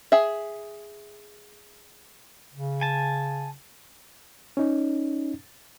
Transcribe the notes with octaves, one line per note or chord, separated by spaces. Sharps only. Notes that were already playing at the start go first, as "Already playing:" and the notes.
G#4 E5
C#3
G#5 A5
C#4 D#4